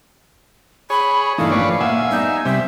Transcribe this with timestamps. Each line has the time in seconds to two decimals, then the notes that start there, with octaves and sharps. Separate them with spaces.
0.90 G#4 C#5 B5
1.38 G2 A#2 E3 A3 D#4 F5
1.51 A1 F3 B4 C#5 D5
1.80 A#2 A#3 E5 F#5 G#5
2.10 G3 B3 D#4
2.45 C3 G3 C5 E5